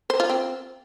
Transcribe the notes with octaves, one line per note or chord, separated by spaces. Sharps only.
C5
F4
C4